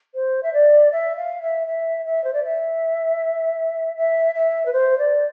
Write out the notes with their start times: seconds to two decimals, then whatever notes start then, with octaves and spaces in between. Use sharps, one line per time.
0.15 C5
0.43 E5
0.53 D5
0.92 E5
1.16 F5
1.42 E5
1.67 E5
2.05 E5
2.24 C5
2.33 D5
2.44 E5
3.96 E5
4.35 E5
4.66 B4
4.73 C5
4.98 D5